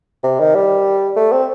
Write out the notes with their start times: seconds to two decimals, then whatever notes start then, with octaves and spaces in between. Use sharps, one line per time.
0.24 C3
0.40 D#3
0.55 G3
1.16 A3
1.32 C4